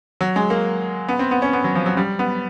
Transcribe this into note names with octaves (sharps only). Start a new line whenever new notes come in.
F#3
G#3
A#3
B3
C4
B3
C#4
B3
F#3
F3
F#3
G3
B3